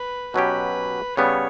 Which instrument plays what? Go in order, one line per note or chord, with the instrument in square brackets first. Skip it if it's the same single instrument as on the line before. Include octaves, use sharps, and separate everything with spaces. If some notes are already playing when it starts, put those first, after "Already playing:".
Already playing: [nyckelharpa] B4
[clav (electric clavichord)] B2 F#3 C#4 G4 [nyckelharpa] B4
[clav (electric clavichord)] C#3 G3 B3 [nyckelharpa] C#5